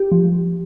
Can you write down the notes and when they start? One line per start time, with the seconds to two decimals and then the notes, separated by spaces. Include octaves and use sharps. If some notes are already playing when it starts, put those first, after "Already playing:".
Already playing: G4
0.12 F3